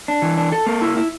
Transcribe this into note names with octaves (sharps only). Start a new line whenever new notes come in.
D4
E3
D4
A4
A#3
E4
E4